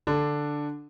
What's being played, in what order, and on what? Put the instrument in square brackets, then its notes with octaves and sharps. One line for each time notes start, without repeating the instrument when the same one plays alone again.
[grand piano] D3 D4